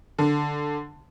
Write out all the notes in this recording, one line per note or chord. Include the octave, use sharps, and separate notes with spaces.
D3